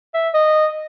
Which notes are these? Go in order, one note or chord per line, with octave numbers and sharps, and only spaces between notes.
E5
D#5